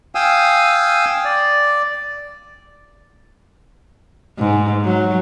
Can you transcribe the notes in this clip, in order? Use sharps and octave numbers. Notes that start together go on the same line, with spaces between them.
F5 G5 G#5 D#6 E6
D5
G#2
F#3